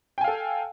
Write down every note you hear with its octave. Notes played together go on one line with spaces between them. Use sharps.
A4 F5 G5 G#5